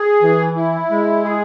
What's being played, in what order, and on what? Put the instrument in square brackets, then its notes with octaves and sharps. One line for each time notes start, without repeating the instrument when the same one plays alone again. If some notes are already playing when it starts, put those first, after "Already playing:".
Already playing: [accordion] G#4
E3
E4
G#3
G#4